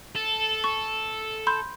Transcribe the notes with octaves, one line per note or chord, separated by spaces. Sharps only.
A4
C#6
B5 C6 G6